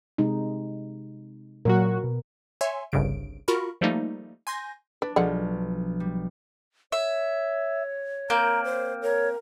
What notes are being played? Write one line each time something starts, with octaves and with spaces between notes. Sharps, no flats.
C3 G#3 D#4
A#2 F#3 F#4 A#4
B2
C#5 E5 G#5 C6
G1 C2 G2 C#3 D7
F4 F#4 A#4 B5 C#6
F3 G3 A3 A#3 D#4
G#5 C6 G6 A#6
D4 B4
B1 D3 F3 G#3 F#5
G3
C#5 E5
A#3 C4 A#5 G6
C5
A#4 C#5